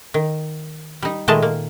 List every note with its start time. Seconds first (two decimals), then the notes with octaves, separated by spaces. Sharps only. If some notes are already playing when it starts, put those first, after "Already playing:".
0.14 D#3
1.02 G3 D#4
1.28 A#2 D#3 G#3 A3 D#5 A5
1.42 A#3